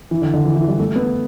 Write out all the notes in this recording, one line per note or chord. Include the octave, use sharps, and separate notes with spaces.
E3
D3
D3
E3
E3
G3
A3
B3